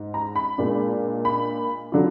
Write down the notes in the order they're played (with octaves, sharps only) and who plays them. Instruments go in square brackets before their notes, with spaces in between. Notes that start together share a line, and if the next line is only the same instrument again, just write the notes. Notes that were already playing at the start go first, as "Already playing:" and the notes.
Already playing: [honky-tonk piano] G#2
A#5
B5
A#2 G#3 D4
B5
D3 F#3 D4 F4